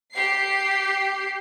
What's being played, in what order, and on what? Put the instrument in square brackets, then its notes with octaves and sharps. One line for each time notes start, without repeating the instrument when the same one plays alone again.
[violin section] G4 C7